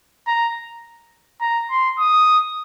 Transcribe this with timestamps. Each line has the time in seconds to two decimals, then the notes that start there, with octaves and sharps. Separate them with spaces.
0.27 A#5
1.41 A#5
1.70 C6
1.99 D#6